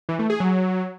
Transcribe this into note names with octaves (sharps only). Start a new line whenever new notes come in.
E3
A3
G#4
F#3